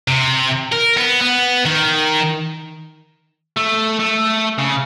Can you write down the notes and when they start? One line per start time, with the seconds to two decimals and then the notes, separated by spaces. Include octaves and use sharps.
0.08 C3
0.72 A#4
0.97 B3
1.21 B3
1.66 D#3
3.56 A3
4.00 A3
4.58 C#3